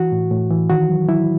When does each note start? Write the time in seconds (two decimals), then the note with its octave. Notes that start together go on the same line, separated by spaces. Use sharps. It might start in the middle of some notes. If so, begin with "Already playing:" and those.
Already playing: E3 F#4
0.12 A2
0.31 A2
0.50 E3
0.69 D#3 F#4
0.89 F#3
1.08 F#3 E4